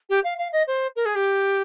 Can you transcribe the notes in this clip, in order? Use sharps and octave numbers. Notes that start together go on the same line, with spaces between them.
G4
F5
F5
D#5
C5
A#4
G#4
G4